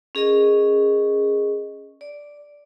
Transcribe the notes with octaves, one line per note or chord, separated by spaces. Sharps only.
C#4 G#4 A#4 D#5
D5